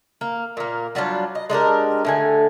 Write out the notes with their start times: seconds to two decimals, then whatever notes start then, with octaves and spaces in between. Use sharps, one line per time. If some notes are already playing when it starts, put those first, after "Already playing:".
0.21 A#3
0.57 A#2 A#3
0.95 F#3 G3 D4 F4
1.35 D#5
1.50 G#3 D4 G4 A#4
2.05 A2 D3 G#5